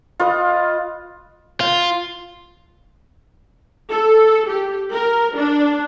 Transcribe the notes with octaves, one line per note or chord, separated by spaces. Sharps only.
F4 B4 D#5
F4
A4
G4
A#4
D4